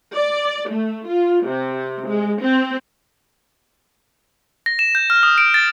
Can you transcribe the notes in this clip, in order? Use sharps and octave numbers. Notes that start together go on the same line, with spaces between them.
D5
A3
F4
C3
G#3
C4
A#6
E7
G6
F6
D#6
D7
A6